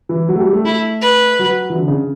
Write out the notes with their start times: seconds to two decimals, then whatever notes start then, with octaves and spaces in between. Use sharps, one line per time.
0.09 E3
0.29 F#3
0.35 A3
0.40 G3
0.53 A3
0.65 A3 E4
1.02 B4
1.39 F#3
1.70 E3
1.75 D3
1.88 C#3